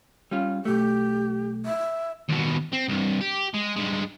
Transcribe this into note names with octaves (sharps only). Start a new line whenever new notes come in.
G3 C#4 F4
B1 A3 G4
E5
D#2 B2
C4
C2 G2
G4
G#3
G2 G#3